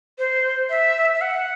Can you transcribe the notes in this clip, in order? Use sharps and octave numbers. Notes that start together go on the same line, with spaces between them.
C5
E5
E5
F#5